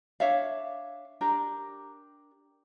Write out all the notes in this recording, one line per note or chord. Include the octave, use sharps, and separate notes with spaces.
D4 C#5 E5 F5
D4 G4 A#4